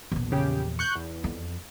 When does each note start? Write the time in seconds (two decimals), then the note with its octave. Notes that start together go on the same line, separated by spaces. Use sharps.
0.12 A#1 E2
0.32 C#3 G4
0.79 C#6 F#6 G6
0.96 E2
1.24 F2